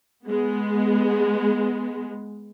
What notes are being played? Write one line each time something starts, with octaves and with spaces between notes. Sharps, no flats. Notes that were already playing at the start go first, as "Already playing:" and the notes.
G#3 B3